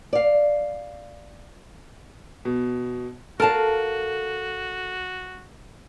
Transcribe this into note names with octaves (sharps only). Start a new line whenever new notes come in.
D5 F5
B2
F#4 A4 A#4 F5 A5